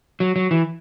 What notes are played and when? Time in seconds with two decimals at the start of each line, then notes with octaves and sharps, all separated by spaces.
0.20 F#3
0.36 F#3
0.51 E3